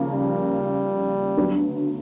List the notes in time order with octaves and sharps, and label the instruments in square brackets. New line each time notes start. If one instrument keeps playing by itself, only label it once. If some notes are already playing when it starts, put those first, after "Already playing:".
Already playing: [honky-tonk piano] D#2 C#3 F3 A#3
[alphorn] G3
[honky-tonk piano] D2 D3 F#3 B3